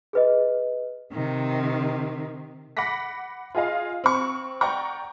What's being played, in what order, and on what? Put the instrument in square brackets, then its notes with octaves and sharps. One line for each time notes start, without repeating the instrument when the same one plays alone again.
[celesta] G#4 B4 D#5
[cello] C3 D#3
[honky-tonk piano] F#5 B5 D6 A#6 B6
F4 G#4 D#5 F5
C4 C#6
D5 F#5 G5 A#5 C#6